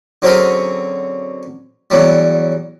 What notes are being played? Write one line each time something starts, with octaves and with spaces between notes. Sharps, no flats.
D3 F#3 C4 C#4 G#4 A#4
E2 F#3 G3